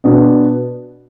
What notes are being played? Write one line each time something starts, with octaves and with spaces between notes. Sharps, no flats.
B2 B3 D4